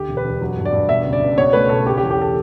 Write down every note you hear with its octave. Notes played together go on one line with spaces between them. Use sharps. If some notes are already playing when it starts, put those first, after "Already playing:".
Already playing: D2 G4
E1
B4
E1
F#3
G2
D5
G2
B2 E5
C#2
D5
C#2
B2 C#5
A3 B4
B1 A4
C#3 G4
G4
E2
G4
A4